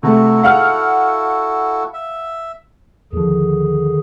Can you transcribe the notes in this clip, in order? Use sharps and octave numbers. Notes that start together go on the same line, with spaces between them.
C3 A3 E4 F#4 A4
F5 F#5 F6
E5
D#2 D3 D#3 F3 G#4